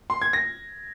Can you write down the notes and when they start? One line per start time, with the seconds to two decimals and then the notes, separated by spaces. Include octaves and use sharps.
0.10 C6
0.21 G#6
0.33 A#6